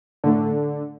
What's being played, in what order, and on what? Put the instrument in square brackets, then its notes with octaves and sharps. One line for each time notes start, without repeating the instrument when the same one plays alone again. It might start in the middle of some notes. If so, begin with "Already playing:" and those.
[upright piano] A2 A3 D4 A4 [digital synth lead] D3